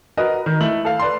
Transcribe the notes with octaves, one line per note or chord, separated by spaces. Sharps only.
F#4 A#4 B4 D#5
D#3
A3 E4 F#7
A4 F5
B4 D5 C6